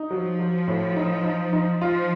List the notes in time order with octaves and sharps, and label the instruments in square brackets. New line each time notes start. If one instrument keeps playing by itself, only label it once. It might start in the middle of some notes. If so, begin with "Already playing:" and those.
Already playing: [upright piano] D#4
[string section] F3 [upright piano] F#3
[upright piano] F#3
A2
D#4
D#4
D#4
[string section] F3 [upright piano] F4